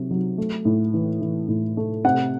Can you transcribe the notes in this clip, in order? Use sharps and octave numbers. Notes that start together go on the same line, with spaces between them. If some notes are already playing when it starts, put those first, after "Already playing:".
Already playing: C3 F#3
F#3
A3
A2
E3
E3
A2
A3
C3 F#5